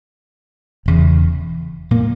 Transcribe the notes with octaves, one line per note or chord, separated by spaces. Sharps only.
E1 E2 C#3
A#2 A#3